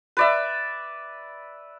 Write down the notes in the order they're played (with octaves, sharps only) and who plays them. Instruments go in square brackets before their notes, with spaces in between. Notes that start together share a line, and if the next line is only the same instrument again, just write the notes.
[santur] B4 D5 E5